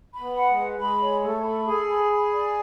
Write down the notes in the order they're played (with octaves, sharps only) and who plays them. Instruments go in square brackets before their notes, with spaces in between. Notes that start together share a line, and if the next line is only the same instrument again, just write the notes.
[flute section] B5
[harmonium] B3
[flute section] F#5
[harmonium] G#3
[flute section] B4
[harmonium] G#3 [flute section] B5
[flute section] C#5
[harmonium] A3 [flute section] A4
[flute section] B5
[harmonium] G#4 [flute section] A4
[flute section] B5
B5
D5